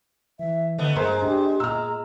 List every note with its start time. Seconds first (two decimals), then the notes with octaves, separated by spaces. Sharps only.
0.39 E3 E5
0.78 D3 A3 B3 D#5
0.96 G2 G#3 A#3 C5 A#5
1.22 D4 G4
1.60 A#2 A#5 E6 F6